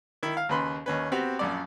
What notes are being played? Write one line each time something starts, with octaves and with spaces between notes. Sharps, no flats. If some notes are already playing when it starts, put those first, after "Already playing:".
D#3 E4
F5
D#2 C#3 B4 B5 C6
D#2 C#4 B4
B3 C4 F#4 G4
A#1 F#2 D5